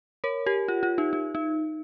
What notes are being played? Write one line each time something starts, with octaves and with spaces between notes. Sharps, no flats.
A#4 C#5
G4 A#4
F4
F4
D#4 G4
D#4
D#4